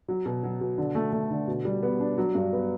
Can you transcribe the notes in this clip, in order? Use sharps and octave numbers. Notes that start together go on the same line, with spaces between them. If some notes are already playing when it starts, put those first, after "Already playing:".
F#3
B2
F#3
B2
D3
A3
A3
D3
B2
G3
B3
D4
F#3
G2
B3